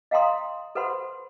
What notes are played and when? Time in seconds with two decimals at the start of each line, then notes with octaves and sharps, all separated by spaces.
0.11 D#5 F5 G5 A#5 C6 D#6
0.75 A4 B4 C5 F#5 B5 C6